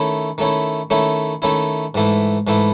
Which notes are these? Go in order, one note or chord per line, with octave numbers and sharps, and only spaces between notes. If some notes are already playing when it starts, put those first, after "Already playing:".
Already playing: D#3 A3 C#4 E4
D#3 A3 C#4 E4
D#3 A3 C#4 E4
D#3 A3 C#4 E4
G#2 E3 A3 E4
G#2 E3 A3 E4